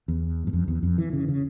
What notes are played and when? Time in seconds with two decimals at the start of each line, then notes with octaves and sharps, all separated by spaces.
0.08 E2
0.47 G2
0.53 F2
0.68 E2
0.83 F2
0.98 E3
1.13 C#3
1.28 C#3